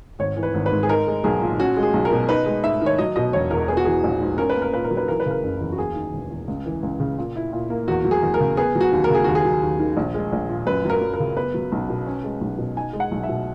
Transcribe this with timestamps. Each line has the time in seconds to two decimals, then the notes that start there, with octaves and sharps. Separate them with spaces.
0.19 G#1 C#5
0.37 E3
0.43 B4
0.54 G#1
0.66 B4
0.72 G#2
0.83 G#4
0.89 D#4 A#4
1.07 G#3
1.24 B1 G#4
1.42 A#2
1.60 C#4 F#4
1.77 G#3
1.83 G#4
1.94 B1
2.05 A#4
2.12 B2
2.29 D#4 B4
2.46 G#3
2.64 G#2 E5
2.81 D#3 C#5
2.99 F#3 D#5
3.16 B2 D#5
3.33 E1 C#5
3.51 E2 A#4
3.68 B3 G#4
3.77 F#4
3.85 E3 G#4
4.04 A#1
4.21 G#2
4.38 C#4 A#4
4.49 B4
4.56 A#3
4.62 A#4
4.73 A#2 B4
4.84 A#4
4.91 F#3
4.97 B4
5.08 E3 A#4
5.20 B4
5.26 C#3 A#4
5.43 F#1
5.61 E2
5.72 F#4
5.78 A#3 G#4
5.96 D#3
6.13 E1
6.31 E2
6.47 C#2
6.66 E3
6.83 C#2
7.00 C#3
7.18 A#2
7.36 E4
7.53 A#2
7.70 A#3
7.88 E2 F#4
8.05 F#3
8.11 G#4
8.23 E2
8.34 A#4
8.40 C#3
8.57 B3 G#4
8.75 F#3
8.81 F#4
8.92 D#2
9.04 A#4
9.10 C#3 G#4
9.24 D#2 F#4
9.35 G#4
9.45 F#3
9.63 D#2
9.80 D#3
9.97 A#1
10.15 G#3
10.33 A#1
10.49 A#2
10.67 F#2 B4
10.85 F#3
10.90 A#4
11.02 F#2
11.14 A#4
11.20 C#3
11.36 B3 B4
11.54 F#3
11.72 B1
11.89 B2
12.06 C#4
12.24 G#3
12.41 B1
12.58 B2
12.76 D#4 G#5
12.93 G#3
13.00 F#5
13.11 B1
13.23 E5
13.29 B2